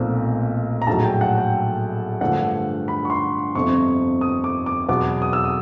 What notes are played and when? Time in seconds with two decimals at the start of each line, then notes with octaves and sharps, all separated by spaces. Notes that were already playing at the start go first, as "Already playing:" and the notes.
Already playing: B1 A#2 F3 A3 C4
0.82 A#5
0.87 A#1 A2 F#3 A5
1.04 G5
1.21 F#5
1.38 G5
2.21 G2 D3 F3 A3 F#5
2.88 B5
3.05 C#6
3.10 C6
3.55 G1 F2 C3 F3 C#6
4.21 D#6
4.44 D6
4.66 D6
4.88 E2 B2 F#3 B3 D6
5.22 D#6
5.33 E6
5.44 D#6